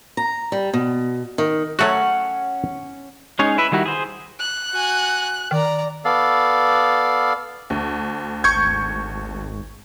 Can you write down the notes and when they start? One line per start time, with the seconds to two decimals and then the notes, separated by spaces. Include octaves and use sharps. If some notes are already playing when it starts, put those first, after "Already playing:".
0.17 A#5
0.52 G3
0.73 B2
1.38 D#3
1.79 F#3 A3 C#4 F#4 F#5
3.39 G#3 C#4 D#4 G#4 C#5
3.58 E4 B4 E5
3.72 D#3 G3 E4 F#4
3.86 G#4 C5
4.39 F#6
4.72 F#4 G#5
5.51 D#3 D5 A#5
6.05 B3 A4 D5 F5
7.70 D2
8.44 G#1 C#6 G6 G#6